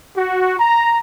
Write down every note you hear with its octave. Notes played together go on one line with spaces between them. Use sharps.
F#4
A#5